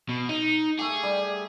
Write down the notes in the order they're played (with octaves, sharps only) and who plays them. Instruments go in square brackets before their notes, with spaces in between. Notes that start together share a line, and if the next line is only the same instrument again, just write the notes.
[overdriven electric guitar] B2
D#4
[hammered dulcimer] A3 G4 [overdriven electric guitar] G#4
[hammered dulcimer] G3